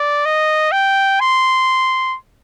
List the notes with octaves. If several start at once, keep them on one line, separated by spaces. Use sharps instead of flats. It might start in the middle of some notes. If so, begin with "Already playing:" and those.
Already playing: D5
D#5
G5
C6